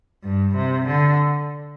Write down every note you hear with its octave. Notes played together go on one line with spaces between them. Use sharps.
G2
C3
D3